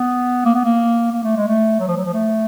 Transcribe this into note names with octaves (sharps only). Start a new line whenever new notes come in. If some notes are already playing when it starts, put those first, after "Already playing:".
Already playing: B3
A#3
B3
A#3
A#3
A3
G#3
A3
F#3
F3
F#3
F3
A3